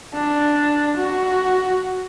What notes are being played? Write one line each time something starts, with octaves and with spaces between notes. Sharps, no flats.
D4
F#4